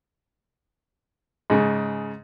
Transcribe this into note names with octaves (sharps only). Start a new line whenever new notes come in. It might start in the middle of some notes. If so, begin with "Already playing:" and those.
G#2 C#3